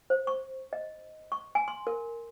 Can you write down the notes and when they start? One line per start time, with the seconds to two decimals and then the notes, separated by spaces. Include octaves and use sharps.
0.10 C5
0.27 C#6
0.73 D#5
1.32 C#6
1.55 G#5
1.68 C6
1.87 A#4